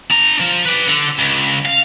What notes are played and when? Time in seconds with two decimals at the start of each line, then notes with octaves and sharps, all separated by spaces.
0.11 D4 A#5
0.40 F3
0.65 B4 D5
0.88 D3
1.19 C#2
1.66 F5